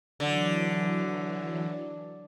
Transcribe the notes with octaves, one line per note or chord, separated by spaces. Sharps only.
D3 E3 F#3